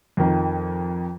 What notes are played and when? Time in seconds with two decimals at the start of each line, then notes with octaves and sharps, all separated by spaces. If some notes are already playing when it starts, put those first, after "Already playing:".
0.17 F2 D#3